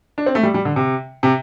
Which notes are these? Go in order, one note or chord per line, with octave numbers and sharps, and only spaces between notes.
D4
C4
A3
G3
G3
D3
C3
C3